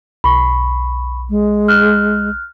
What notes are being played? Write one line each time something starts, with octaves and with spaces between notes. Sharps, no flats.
B1 B5 C#6
G#3
F6 F#6